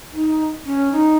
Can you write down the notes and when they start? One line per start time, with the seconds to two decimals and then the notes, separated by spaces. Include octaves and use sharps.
0.13 D#4
0.65 C#4
0.92 D#4